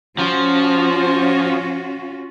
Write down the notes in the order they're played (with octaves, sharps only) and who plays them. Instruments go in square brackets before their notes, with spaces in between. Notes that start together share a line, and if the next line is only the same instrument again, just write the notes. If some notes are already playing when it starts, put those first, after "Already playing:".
[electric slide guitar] F3 [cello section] C#4 F4 F#4